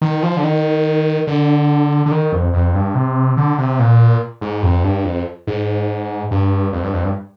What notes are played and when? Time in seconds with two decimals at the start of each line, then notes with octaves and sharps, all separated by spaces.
0.02 D#3
0.23 F3
0.37 D3
0.44 D#3
1.27 D3
2.06 D3
2.11 D#3
2.32 F2
2.53 F2
2.75 G2
2.95 C3
3.37 D3
3.58 C3
3.79 A#2
4.41 G#2
4.63 F2
4.83 G2
5.04 F2
5.47 G#2
6.31 G2
6.73 F2
6.83 G2
6.93 F2
7.04 G2